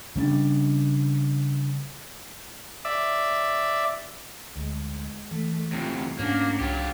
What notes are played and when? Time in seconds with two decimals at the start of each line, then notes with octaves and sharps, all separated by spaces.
0.16 C#3 G3 C#4 D4
2.85 D5 E5
4.56 D2 G#3
5.31 E3 A3
5.72 E2 C3 F#3 F4
6.19 G#2 A#3 C#4 D4 F#4
6.60 C2 F#3 F4 G4